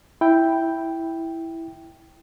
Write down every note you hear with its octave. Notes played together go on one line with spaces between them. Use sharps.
E4 G5